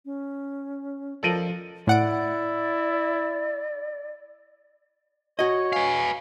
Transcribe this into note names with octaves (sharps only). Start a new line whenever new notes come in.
C#4
F3 A4 A#4 D5 D#5
A2 E4 D5 F#5 D7
F#4 C#5 D#5
B4 F5 G#5